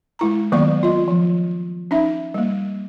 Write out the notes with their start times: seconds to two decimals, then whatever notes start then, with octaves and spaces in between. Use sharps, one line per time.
0.19 G#3 E4 A#5
0.52 D#3 F#3 A#3 B3 D5 C#6
0.83 F4 D#5
1.08 F3
1.91 C#4 D#4 E5
2.34 G3 A#3